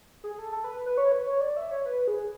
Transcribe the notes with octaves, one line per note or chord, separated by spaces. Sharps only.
G#4
A4
A4
B4
B4
C#5
B4
C#5
D5
E5
C#5
B4
G#4